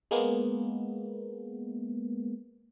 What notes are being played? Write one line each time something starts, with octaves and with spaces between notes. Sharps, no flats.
G#3 A#3 B3